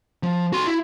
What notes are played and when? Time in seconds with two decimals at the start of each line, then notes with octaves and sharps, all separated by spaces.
0.23 F3
0.52 F#4 C6
0.66 E4